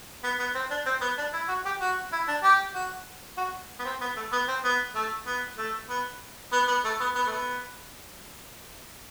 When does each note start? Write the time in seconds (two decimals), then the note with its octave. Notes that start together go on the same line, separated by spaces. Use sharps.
0.24 B3
0.39 B3
0.55 C4
0.70 D4
0.86 C4
1.01 B3
1.18 D4
1.34 E4
1.49 F#4
1.66 G4
1.81 F#4
2.13 E4
2.28 D4
2.44 G4
2.75 F#4
3.38 F#4
3.79 B3
3.85 C4
4.01 B3
4.17 A3
4.32 B3
4.48 C4
4.64 B3
4.95 A3
5.27 B3
5.58 A3
5.89 B3
6.52 B3
6.68 B3
6.85 A3
7.00 B3
7.15 B3
7.27 A3
7.31 B3